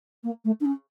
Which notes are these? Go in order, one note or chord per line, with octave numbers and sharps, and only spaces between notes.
A#3
A3
D4
C#4